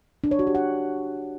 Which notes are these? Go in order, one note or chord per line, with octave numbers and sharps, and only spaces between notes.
D4
C#5
F#4
G4
F#5